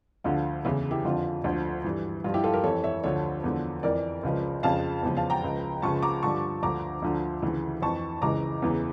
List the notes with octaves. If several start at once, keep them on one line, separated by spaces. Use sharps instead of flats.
D2 D3 F3 F4
E2 C#3 E3 E4
E4 G4
F2 D3 F3 F4
D2 D3 F3
G2 E3
G2 F3 F4
E4 G4
F4 A4
G4 A#4
F2 E3 A4 C#5
C#5 E5
D2 D3 F3 A4 C#5
E2 D3 F3
F2 E3 A#4 D5
C#2 C#3 F3
F2 C#3 F3 F5 A5
E2 C#3 F3
F5 A5
G5 A#5
C#2 C#3 F3
C#2 C#3 F3 A5 C#6
A#5 D6
G2 D3 F3 A5 C#6
D2 D3 F3 A#5 D6
D2 D3 F3
D2 C#3 E3
F2 E3 A5 C#6
C#2 C#3 E3 A#5 D6
E2 C#3 E3